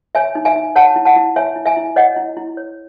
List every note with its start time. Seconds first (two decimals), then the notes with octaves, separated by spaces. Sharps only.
0.15 C#5 E5 G#5
0.35 D#4
0.45 E5 G#5
0.56 D#4
0.76 C#5 F#5 A5
0.96 E4
1.05 F#5 A5
1.16 E4
1.36 C#5 E5 G#5
1.56 E4
1.66 E5 G#5
1.77 E4
1.96 C#5 D#5 F#5
2.16 E4
2.37 E4
2.57 C#5